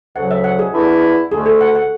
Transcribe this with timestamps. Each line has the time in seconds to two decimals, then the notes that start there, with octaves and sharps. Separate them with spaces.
0.16 D2 C#3 F#3 F#5
0.31 E5
0.44 F#5
0.59 G#4
0.73 E2 D3 A3 E4
1.32 D2 D3 A3 G#4
1.46 A4
1.61 F#5
1.75 F#5